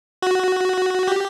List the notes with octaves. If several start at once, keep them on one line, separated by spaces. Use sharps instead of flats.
F#4
G4